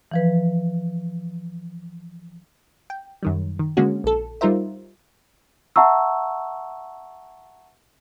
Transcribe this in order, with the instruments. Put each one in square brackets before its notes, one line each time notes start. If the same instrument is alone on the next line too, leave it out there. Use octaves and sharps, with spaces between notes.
[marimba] E3 F3 B4
[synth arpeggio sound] G5
F#2 D#3 G3
D#3
D3 G#3 A#3 C#4 F#4
A#1 A4
G3 D#4 F4 A#4 C5 E5
[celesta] E5 F#5 A5 A#5 C#6 E6